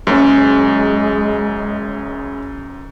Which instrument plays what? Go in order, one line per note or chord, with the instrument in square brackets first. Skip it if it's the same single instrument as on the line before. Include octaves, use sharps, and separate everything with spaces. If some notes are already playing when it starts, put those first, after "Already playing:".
[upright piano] F#1 C#4 [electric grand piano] F#2 [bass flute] G#3